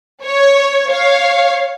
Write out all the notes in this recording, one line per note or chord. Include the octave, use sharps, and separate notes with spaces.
C#5
C#5 F5